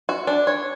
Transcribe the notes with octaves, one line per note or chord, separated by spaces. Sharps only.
F#4
D4
C#5